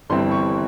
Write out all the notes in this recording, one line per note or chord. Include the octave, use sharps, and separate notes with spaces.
G1 G2 E3 G3 C4 C6
C#6